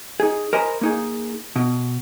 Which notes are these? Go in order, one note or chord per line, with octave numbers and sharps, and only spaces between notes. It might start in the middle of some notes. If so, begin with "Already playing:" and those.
D#4 G#4
A#4 C5 D#5 G#5 A#5 B5
A#3 D#4 G#4
B2